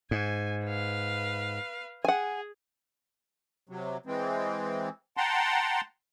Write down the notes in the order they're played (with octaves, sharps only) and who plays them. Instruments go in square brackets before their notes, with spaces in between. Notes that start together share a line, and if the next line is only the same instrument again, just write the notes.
[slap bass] G#2 [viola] G#5
[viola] B4 F5
[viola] G#4 [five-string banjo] F#5 G#5
[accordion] C3 F#3
E3 G#3 C4
F#5 G5 A5 A#5 C6